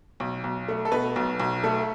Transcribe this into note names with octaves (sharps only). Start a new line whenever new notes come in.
B1
B1
A3
A4
B2 B4
B1
B1
A3 A4